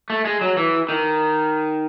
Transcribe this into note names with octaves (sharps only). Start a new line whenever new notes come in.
A3
G#3
F#3
E3
D#3